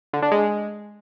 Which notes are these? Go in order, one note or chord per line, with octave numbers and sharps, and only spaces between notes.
D3
D4
G#3